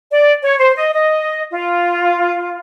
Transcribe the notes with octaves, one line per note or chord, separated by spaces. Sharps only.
D5
C#5
C5
D#5
D#5
F4